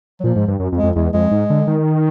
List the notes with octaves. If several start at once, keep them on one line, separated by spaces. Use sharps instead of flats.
F#3
A#2 F3
G#2
G2
F#2
F2
G#3
F2
E2 G#3
F2 G#3
G#2
D3
D#3